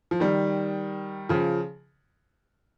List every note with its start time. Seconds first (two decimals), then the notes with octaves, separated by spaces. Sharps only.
0.11 F3
0.20 D#3 G3
1.29 C#3 F3